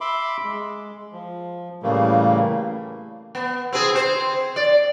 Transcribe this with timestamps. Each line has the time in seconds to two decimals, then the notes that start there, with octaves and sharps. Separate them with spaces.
0.01 E5 B5 C6 D6
0.44 G#3
1.12 F3
1.83 A2 C#3 E3 G3 A3 A#3
3.35 B3
3.73 C4 G#4
3.94 C4 C5
4.56 D5